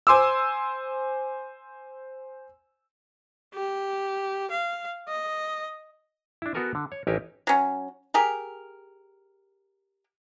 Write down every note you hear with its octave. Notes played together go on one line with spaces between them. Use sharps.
C5 G#5 C6 D6 E6
G4
F5
D#5
D4 E4
B3 F#4 A4 A#4 G#5
D3
C#5
A1 D#4 E4 G4 A#4 G#5
F#3 C#4
G4 G#4 A#4